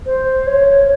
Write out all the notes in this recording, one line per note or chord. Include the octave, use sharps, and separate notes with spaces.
C5
C#5